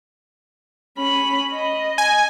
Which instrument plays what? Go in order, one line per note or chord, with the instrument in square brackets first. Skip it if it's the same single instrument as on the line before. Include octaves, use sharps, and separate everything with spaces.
[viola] C#4 B5
D#5
[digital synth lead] G#5